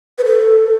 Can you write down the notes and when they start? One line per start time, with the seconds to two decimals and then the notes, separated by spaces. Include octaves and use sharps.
0.18 B4
0.25 A4